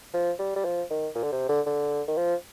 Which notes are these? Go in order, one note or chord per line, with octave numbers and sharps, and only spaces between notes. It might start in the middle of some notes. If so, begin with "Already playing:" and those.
F3
G3
G3
F3
D#3
A#2
D3
C3
D3
D3
D#3
F3